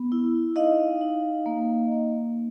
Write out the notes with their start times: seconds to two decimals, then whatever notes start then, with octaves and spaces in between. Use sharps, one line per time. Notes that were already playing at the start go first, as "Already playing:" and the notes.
Already playing: B3
0.12 E4
0.56 D#4 D#5 F5
1.01 D#4
1.46 A#3
1.92 A#3